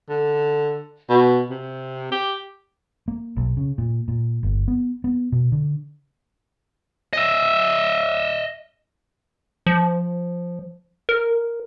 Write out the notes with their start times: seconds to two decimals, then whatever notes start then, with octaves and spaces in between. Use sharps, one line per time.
0.09 D3
1.10 B2
1.50 C3
2.12 G4
3.08 A#3
3.37 B1
3.57 C#3
3.78 A#2
4.08 A#2
4.43 G1
4.68 B3
5.04 B3
5.32 B2
5.52 D3
7.13 D#5 E5
9.66 F3
11.09 A#4